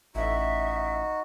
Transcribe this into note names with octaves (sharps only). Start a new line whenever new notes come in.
A1 D#4 F#4 E5